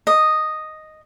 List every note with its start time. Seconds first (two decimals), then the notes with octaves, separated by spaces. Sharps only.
0.07 D#5